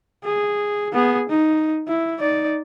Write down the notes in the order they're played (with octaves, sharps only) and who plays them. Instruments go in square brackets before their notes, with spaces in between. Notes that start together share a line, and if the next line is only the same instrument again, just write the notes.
[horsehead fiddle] G#4
B3 G#4
D#4
E4
D#4 D5